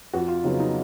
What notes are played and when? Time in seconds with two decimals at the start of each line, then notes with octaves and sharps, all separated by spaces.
0.13 F2 F#4
0.28 F4
0.43 C#3 F#3 B3 D#4
0.60 D#4